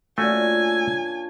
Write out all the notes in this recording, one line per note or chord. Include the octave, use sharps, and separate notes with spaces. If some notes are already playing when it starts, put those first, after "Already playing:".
A#2 A3 C#4 D4 F#4 G#5